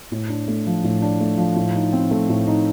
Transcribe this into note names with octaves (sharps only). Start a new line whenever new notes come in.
A2
D4
A3
F3
A2
D4
A3
F3
A2
D#4
C4
A3
A2
D#4